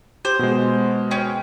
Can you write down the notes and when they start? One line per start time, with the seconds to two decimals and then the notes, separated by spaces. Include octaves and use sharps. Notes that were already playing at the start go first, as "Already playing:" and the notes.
0.25 G4 C5
0.39 B2 G#3
1.11 C#4 G5